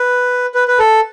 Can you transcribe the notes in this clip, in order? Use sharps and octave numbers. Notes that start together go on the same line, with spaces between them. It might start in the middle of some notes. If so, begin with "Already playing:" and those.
Already playing: B4
B4
B4
A4